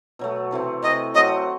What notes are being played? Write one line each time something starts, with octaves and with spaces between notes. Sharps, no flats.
B2 F#3 A3
C3 E3 A3 C4
C3 E3 A3 C4 D#5
F#3 A3 C4 F#4 D#5